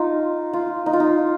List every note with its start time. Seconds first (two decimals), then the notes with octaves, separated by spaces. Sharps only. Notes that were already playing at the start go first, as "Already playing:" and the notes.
Already playing: D#4 F4
0.53 F4
0.86 D#4
0.93 F4
1.00 D#4